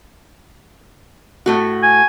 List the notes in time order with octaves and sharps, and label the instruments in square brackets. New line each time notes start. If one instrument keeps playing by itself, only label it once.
[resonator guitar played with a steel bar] A2 A3 F#4
[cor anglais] G#5